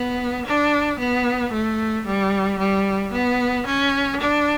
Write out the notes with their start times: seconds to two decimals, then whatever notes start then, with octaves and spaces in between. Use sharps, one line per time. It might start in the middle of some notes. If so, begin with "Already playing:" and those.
Already playing: B3
0.46 D4
0.99 B3
1.53 A3
2.06 G3
2.59 G3
3.12 B3
3.66 C#4
4.21 D4